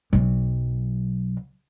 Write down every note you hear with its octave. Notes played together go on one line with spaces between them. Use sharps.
B1 F#3